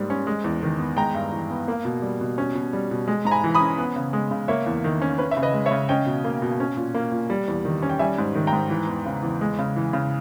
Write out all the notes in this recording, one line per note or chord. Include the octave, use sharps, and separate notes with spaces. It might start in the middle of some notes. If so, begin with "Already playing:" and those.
Already playing: G#2 G3 A#3
C#4
G#3
E2
D#3
B3
G#3 G5 A#5
G2
E3
B3
A#3
B2
G3
B2
C#4
B2
G3
B2
G#3
G#2 A#5
G#5 B5
E3
B5 D#6
C#4
B3
C#3
G#3
C#3
A#3 C#5 E5
E2
D#3
C#4
C#4 B4
E5
C#3
B4 D#5
G#3
C#5 E5
C#3
C#4 D#5 G5
B2
A#3
B2
C#4
A#2
A#3
A#2
G3
E2
D#3
C#4
G5
G3 E5 G#5
G#2
D#3
G5 A#5
G#2
E3
E2
C#3
E2
G#3
C#3
E3
C#3